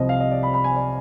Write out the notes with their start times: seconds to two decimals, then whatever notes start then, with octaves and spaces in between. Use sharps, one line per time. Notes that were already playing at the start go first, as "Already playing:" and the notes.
Already playing: C2 C3 F3 D#5
0.09 F5
0.20 D#5
0.31 D5
0.43 B5
0.54 B5
0.64 G#5
0.76 D5